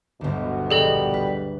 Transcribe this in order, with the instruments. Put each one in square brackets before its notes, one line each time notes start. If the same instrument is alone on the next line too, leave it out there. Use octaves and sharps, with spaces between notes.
[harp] G1 D2 [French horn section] B2
[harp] A#1 [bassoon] G3 [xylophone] G#4 A4 D#5
[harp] B4